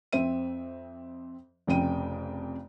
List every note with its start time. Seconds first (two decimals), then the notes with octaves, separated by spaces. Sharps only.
0.13 F2 C4 E5 D#7
1.67 F1 F2 C#3 G5 D#7